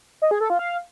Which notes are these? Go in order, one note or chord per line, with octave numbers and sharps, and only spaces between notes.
D#5
G#4
A4
F4
F5